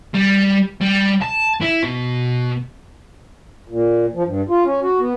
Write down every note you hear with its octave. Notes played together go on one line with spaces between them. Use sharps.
G3
G3
A5
E4
B2
A#2
F3
G2
F4
C#4
F#4
B3